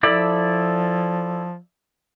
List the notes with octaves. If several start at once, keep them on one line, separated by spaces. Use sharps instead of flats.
F3 E4 A4 D5